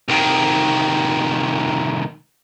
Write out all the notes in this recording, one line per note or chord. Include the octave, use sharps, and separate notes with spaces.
C2 D#3